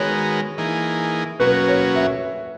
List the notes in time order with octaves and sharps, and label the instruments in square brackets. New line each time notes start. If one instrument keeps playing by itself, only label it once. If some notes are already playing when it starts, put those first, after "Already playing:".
Already playing: [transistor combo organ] D#3 G#3 B3 F#4 A#4 [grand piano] C#5
[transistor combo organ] E3 A#3 D#4 G#4
[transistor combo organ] B2 F#3 A#3 C#4 F#4 [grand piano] B4
[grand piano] C#5
E5